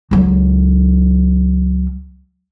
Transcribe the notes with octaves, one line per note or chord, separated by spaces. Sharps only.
C#2 F#3